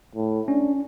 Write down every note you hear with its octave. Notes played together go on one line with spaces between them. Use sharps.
A2
C#4 D4